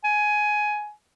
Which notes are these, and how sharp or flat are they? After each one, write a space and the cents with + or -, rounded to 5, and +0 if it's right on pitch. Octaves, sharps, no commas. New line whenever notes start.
G#5 +10